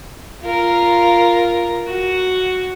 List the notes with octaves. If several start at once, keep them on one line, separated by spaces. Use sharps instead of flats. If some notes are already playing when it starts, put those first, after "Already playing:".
F4 A#4
F#4